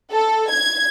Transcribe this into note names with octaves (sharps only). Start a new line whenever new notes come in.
A4
G#6